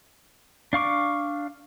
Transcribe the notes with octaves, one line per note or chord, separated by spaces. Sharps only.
D4 F5 C#6 D6